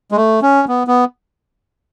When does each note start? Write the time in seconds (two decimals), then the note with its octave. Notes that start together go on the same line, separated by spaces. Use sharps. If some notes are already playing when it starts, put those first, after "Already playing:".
0.12 G#3
0.17 A3
0.42 C#4
0.68 B3
0.87 B3